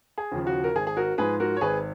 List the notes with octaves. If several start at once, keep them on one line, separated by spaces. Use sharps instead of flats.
G#4
D#2 C#3 F3
F#4
A#4
G#1 G#4
G#4
F#4 A#4
G#2 F3 G#4 B4
F#4 A#4
C#5
G#1 G#4 B4